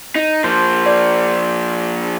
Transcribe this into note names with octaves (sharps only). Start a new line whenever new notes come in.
D#4
F3 A#3 C5
D5